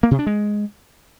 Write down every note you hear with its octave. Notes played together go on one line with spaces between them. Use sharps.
A#3
C3
D4
G#3